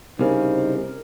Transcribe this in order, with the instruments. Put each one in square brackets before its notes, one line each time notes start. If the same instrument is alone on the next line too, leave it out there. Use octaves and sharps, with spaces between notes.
[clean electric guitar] C2 C#3 [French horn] D#4 [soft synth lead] A#4 [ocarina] C5